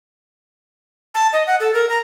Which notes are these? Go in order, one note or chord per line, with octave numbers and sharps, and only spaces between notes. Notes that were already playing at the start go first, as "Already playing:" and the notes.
A5
D#5
F#5
A4
A#4
A#5